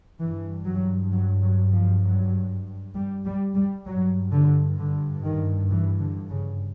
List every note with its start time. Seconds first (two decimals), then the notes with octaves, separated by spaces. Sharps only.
0.21 G2 E3
0.65 F#3
1.12 F#3
1.42 F#3
1.73 F3
2.03 F#3
2.95 G3
3.26 G3
3.55 G3
3.86 G2 F#3
4.32 D3
4.78 D3
5.24 D#3
5.69 E3
5.99 D3
6.30 C#3